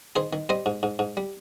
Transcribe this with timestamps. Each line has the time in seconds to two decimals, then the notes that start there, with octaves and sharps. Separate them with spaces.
0.16 D#3 G#4 C5
0.33 D#3
0.49 G3 C5 D#5
0.66 G#2
0.83 G#2
0.99 G#2
1.17 G3